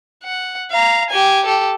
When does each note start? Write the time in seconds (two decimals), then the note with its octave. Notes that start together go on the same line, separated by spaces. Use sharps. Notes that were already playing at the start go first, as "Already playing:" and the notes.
0.24 F#5
0.71 F5 A#5
1.10 G4 G#5
1.45 G4 A4